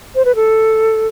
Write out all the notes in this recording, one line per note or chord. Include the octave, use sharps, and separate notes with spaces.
C5
B4
A4